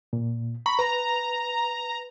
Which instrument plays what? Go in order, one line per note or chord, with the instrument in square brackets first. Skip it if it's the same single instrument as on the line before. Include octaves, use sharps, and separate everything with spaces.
[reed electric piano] A#2
[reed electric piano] A#5 C#6 [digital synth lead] B5
[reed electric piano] B4 [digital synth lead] A#5